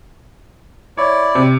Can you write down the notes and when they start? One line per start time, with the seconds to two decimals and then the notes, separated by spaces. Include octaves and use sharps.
0.97 E4 C#5 D5
1.35 C3